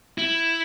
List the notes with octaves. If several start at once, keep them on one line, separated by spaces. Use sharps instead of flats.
E4